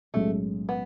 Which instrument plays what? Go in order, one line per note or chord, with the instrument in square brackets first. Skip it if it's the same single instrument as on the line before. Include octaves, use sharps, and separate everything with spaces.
[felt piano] B1 A2 G#3 C#4 [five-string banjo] A3
[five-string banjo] B3